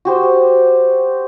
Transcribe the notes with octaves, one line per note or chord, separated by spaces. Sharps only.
F#4 G4 C5